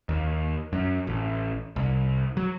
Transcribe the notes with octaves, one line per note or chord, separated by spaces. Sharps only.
D#2
F#2
A1
C2
F#3